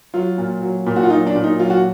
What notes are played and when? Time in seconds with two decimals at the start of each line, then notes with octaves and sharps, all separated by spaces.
0.14 F#3 F4
0.38 A#2
0.62 F#3
0.86 A#2
0.96 F#4
1.03 F4
1.10 F#3 D#4
1.27 D4
1.35 A#2
1.44 D#4
1.59 F#3 F4
1.70 F#4